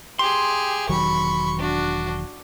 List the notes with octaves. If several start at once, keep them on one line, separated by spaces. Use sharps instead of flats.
G4 G#4 C6
E1 D#3 F#3 B5 C#6
D4 F#4